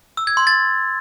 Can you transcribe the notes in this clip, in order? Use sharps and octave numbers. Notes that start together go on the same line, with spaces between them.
E6
G#6
C6
A6